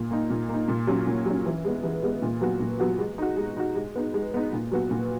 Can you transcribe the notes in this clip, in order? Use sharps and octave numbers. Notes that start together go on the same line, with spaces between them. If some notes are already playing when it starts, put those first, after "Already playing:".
Already playing: A#2
A#3 D#4
A#2
A#3 D#4
A#2
F#3 C#4
A#2
F#3 C#4
E3
G#3 B3
E3
G#3 B3
A#2
F#3 B3 F#4
A#2
F#3 B3 F#4
G#3
D#4 F#4
G#3
D#4 F#4
G#3
B3 D#4
G#3
B3 D#4
A#2
F#3 B3 F#4
A#2